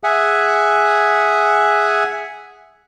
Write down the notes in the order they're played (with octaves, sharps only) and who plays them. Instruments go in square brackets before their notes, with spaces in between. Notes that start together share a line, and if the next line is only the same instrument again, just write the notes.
[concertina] G#4 E5 F#5 G#5